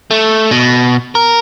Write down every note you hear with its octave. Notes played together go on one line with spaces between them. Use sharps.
A3
B2
A#4